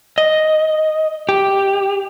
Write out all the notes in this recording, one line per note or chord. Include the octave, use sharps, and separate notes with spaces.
D#5
G4